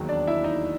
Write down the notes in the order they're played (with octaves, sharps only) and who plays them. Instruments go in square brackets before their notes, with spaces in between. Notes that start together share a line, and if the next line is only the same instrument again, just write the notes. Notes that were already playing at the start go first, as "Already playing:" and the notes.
Already playing: [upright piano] E1 D#2 D#3 F#3
D4 D5
E4 E5
D#4 D#5